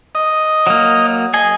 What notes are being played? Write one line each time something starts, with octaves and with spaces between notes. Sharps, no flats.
D#5
F#3 A#3
G#4 D#5 G#5